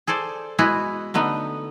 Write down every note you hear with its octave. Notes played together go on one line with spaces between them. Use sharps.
G#4 A4 C5 D5
G#3 B3 E4 F#4 G#4
D3 A3 B3 D#4